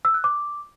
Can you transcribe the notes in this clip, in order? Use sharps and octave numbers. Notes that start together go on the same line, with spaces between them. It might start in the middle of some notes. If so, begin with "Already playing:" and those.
E6
F#6
D6